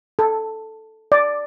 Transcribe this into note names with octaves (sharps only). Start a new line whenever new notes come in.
A4
D5